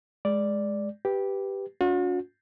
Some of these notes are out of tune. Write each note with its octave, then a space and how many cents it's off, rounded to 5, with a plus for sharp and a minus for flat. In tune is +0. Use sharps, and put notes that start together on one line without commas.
G#3 +5 D5 +0
G4 +0 B4 +0
C#4 +40 F#4 -45